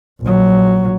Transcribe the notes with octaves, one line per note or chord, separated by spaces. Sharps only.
A#1 F#3